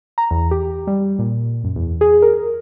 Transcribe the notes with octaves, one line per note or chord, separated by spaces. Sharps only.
A#5
E2
G4
G3
A#2
F#2
E2
G#4
A#4